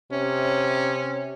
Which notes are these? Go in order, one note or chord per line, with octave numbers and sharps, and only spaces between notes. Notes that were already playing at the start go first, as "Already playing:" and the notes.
C3 C#4